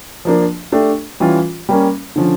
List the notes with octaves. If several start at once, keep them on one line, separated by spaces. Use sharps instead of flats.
F3 A#3 D4
A3 D4 G4
E3 G3 C#4 F4
G3 A#3 C#4
D3 F3 C#4